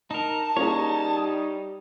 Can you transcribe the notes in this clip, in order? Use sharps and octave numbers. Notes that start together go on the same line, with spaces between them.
D#4 A#4 A5
G3 A#3 C#4 D#4 G#4 C#5
D#6